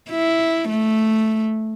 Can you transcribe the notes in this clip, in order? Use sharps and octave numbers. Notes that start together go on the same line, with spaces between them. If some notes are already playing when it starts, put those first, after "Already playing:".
E4
A3